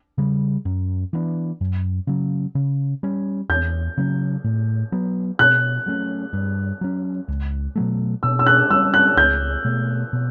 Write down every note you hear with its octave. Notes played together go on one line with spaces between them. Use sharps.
C#3 G3
F#2
E3 B3 D4
F#2
C#3 F#3
C#3
G3 C#4
E2 G6
C#3 F#3 C#4
A2
F#3 B3
B2 F#6
F#3 A3 C#4
G2
F#3 C#4
C#2
B2 F#3 A3
B2 E6
E6
F#6
G3 C#4 E6
F#6
C#2 G6
B2 A3
B2